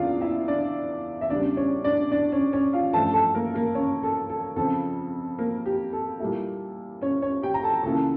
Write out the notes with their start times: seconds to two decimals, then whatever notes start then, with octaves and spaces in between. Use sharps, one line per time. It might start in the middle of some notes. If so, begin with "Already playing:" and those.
Already playing: E2 C#3 E3 A#3 D4 F4 D5 F5
0.21 E4 E5
0.48 D4 D5
1.21 E5
1.30 E2 C#3 G3 D4 D5
1.57 C#4 C#5
1.84 D4 D5
2.12 D4 D5
2.32 C#4 C#5
2.53 C#4 C#5
2.73 F4 F5
2.93 G2 F3 A3 C#4 A4 A5
3.13 A4 A5
3.35 A#3 A#4
3.54 A#3 A#4
3.75 C#4 C#5
4.03 A4
4.29 A4
4.56 F2 C#3 F3 A4
5.39 A#3 A#4
5.66 G4
5.93 A4
6.20 A#2 G3 A#3 E4 A4
7.01 C#4 C#5
7.22 C#4 C#5
7.42 G4 G5
7.54 A#5
7.63 A4 A5
7.83 C#2 C#3 E3 A#3 A4 A5